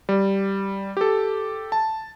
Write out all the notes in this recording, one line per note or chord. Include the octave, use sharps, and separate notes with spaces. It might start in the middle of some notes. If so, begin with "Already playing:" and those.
G3
G4 A4
A5